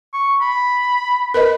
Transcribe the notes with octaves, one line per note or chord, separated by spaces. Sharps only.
C#6
B5
A#4 B4 D#5 B5